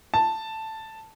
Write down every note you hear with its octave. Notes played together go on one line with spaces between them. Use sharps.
A5